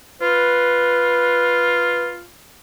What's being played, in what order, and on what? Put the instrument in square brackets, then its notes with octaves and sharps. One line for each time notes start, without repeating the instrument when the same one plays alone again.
[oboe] F4 [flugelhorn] B4